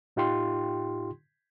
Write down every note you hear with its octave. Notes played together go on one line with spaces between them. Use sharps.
A2 D#4 F4 G4 G5 C6